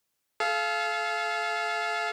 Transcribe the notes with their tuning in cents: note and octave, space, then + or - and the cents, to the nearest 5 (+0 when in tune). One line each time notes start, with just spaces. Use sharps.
A4 -40 F5 -15